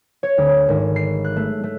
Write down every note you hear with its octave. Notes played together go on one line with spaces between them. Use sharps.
C#5
D2
G#1
C7
F#6
A3
A3